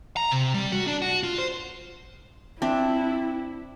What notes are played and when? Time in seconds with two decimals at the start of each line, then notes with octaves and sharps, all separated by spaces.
0.17 A#5
0.31 C3
0.54 G3
0.72 F#4
0.87 D4
1.02 F#4
1.23 F4
1.38 C5
2.62 C4 D4 E4 E5